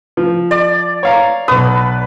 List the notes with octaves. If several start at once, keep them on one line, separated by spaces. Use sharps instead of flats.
F3
D5
C#5 F5 A#5
B1 B4 D#6